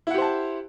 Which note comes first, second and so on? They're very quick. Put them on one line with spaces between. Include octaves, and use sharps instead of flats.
E4 F#5 G4 C5 A5